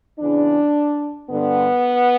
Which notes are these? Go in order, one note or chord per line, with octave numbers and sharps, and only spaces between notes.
E2 C#3 E3 D4
G2 D3 B3